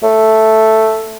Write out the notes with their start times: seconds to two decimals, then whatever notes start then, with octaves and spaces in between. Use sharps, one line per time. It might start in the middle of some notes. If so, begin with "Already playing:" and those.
0.04 A3